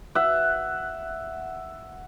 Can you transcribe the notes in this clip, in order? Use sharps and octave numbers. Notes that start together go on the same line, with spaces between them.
E5 F#5